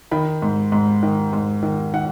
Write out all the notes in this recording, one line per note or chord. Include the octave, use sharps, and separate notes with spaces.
D#3 B5
G#2
G#2
D#3
G#2
D#3
D#3 F#5